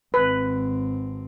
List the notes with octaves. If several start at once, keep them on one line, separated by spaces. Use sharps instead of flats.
G#1 C4 B4